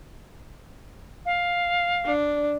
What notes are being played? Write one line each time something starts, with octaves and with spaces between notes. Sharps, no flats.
F5
D4